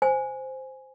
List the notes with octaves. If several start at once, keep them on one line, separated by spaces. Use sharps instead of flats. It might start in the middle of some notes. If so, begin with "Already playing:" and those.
C5 G#5